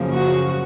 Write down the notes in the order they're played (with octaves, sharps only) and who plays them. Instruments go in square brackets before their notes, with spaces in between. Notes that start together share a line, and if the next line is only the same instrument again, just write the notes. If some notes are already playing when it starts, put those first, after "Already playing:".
Already playing: [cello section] F#2 C#3 F3 A#3
F#4